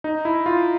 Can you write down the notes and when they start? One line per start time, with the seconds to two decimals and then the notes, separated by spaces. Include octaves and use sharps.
0.04 D#4
0.25 E4
0.46 F4